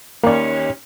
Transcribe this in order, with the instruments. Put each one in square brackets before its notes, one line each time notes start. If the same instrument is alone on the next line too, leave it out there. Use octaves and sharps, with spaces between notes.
[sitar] D#2 C#4 [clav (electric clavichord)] A#3 D5